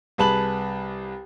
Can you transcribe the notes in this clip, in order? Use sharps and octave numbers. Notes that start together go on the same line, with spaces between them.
C2 G#4 B4 A5 B5 F#7